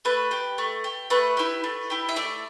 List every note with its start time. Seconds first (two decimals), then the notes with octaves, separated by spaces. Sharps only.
0.05 A3 B4
0.31 G4
0.58 A3
0.84 G4
1.10 A3 B4
1.37 E4 G4
1.64 A3
1.90 E4 G4
2.09 E5
2.16 A3 D5